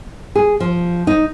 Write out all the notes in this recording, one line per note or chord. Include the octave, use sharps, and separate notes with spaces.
G#4
F3
D#4